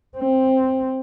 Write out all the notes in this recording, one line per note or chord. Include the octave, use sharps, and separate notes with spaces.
C4